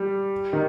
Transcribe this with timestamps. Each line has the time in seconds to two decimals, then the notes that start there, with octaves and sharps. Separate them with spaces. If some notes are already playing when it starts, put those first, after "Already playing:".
Already playing: G3
0.53 D#3